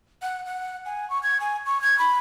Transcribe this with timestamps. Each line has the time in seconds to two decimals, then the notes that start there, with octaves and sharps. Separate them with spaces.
0.22 F#5
0.46 F#5
0.85 G#5
1.10 C#6
1.23 G#6
1.40 G#5
1.66 C#6
1.82 G#6
1.99 B5